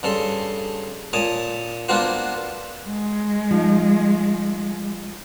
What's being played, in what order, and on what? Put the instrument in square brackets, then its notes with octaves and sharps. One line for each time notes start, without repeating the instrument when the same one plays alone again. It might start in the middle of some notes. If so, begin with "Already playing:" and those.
[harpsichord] G2 C#3 A4 C6
A#2 C#5 A5 D#6
A#3 B3 D4 F4 F#4 C5
[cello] G#3
[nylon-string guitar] F3 D#4